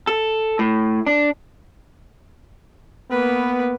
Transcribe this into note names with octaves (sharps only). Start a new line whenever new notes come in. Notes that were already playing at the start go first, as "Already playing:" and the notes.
A4
A2
D4
A#3 B3 B4